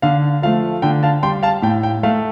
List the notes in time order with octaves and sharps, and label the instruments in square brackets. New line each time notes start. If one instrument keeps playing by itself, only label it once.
[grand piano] D3 F5
F3 A3 F5
D3 G5
F5 A5
G3 G5 C6
F5 A5
A2 G5
G5
A3 F5